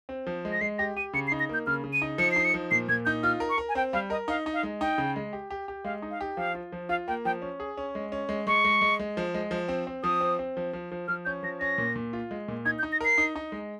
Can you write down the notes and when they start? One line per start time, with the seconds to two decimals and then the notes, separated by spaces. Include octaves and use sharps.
0.09 C4
0.27 F3
0.45 G#3
0.52 A#6
0.61 G#3 C7
0.79 G4 A#6
0.97 G4 D#7
1.13 C#3 C#7
1.27 C7
1.32 D#4
1.40 A#6
1.49 A#3 G6
1.67 C#3 F6
1.84 C#3
1.93 D#7
2.02 D#4
2.18 F3 C#7
2.31 D#4 C7
2.45 C#7
2.54 F3
2.71 A#2 C7
2.88 A#2 G#6
3.05 D#4 G6
3.23 F4 F6
3.40 A#4
3.49 C#6
3.58 A#4
3.69 G#5
3.75 C4 G5
3.93 G3 F5
4.10 A#4 D#5
4.28 D#4 F5
4.46 D#4
4.54 F5
4.63 G#3
4.81 D#4 G5
4.98 C#3
5.16 G#3
5.33 G4
5.50 G4
5.68 G4
5.84 G#3 F5
6.02 D#4
6.11 F5
6.21 G4
6.37 F3 F5
6.55 F4
6.72 F3
6.89 F4 F5
7.08 A#3 G5
7.25 F3 G5
7.42 C#4
7.60 G#4
7.77 C#4
7.95 G#3
8.12 C#4
8.29 G#3
8.47 G#3 C#6
8.64 G#3
8.81 G#3
8.99 G#3
9.17 F3
9.34 G#3
9.51 F3
9.68 C4
9.87 C4
10.03 F3 D#6
10.21 C4
10.39 C4
10.57 F3
10.73 F3
10.92 F3
11.08 F3 F6
11.25 C#4 G6
11.43 F3 A#6
11.60 C#4 A#6
11.78 A#2
11.96 A#2
12.13 F4
12.31 G#3
12.48 A#2
12.65 D#4 G#6
12.79 G6
12.83 D#4
12.92 A#6
13.01 A#4 C7
13.18 D#4
13.36 D#4
13.52 G#3